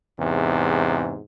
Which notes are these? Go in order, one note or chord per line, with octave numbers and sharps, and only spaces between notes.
E2 G#2 C3